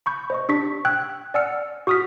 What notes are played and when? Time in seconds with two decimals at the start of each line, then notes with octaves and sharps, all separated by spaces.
0.06 B5 C#6 G6
0.30 C5 D#5 C#6
0.49 D4 G4 C#6 B6
0.85 G5 E6 F#6 G#6
1.34 D5 F#5 G#5 E6 F6 C#7
1.87 F#4 C#6 D#6 F6 B6